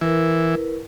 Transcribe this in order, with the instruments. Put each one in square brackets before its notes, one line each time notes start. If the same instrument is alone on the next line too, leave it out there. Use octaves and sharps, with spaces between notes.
[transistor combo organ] E3 [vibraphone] E4 A#4 B4